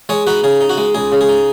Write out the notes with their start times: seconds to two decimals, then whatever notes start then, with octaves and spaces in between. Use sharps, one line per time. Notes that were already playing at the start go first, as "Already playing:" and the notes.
0.09 G#3 G#4 C#5
0.27 D#4 F#4 B4
0.44 C#3 G#4
0.61 D#4
0.69 F#4
0.78 G#3
0.95 C#2 G#4
1.12 C#3
1.21 G#4
1.29 D#4